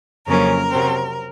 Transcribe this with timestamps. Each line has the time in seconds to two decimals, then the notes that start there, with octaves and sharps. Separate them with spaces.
0.27 F2 C#3 F#3 A#3 C#4 A#4
0.70 C3 F#3 C4